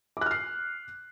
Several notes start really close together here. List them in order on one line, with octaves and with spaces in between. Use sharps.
D6 F#6 F6 C7